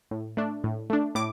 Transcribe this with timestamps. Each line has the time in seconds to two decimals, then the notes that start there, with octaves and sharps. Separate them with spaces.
0.11 A2
0.37 A3 D4
0.64 A2
0.90 A3 D4
1.15 A2 D6